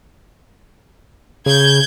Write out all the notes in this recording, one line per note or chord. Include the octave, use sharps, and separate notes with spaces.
C#3 G6 G#6